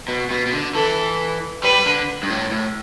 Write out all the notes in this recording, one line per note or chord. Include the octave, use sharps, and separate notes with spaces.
B2
B2
B2
D3
E3 A4
G3 B4
D3
G2
A2
A2